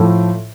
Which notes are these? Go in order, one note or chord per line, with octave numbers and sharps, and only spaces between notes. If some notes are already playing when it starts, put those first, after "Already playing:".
Already playing: A2 F3 A3